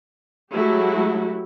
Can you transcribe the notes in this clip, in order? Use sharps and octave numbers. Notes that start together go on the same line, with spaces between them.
F#3 G#3 A3 E4 F#4 G4